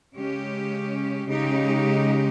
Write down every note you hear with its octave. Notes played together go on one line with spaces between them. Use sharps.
C#3 G#3 C#4 G4
C#3 G#3 D#4 G4